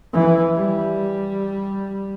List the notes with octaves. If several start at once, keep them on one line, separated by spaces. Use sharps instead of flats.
E3
G3